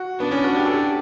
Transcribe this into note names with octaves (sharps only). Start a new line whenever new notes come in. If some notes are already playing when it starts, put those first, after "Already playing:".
Already playing: F#4
B3 D4
C#4
F#4
G4
A4
G4